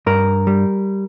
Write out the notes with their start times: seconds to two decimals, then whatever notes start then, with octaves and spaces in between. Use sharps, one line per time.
0.06 G2 A#4
0.47 G3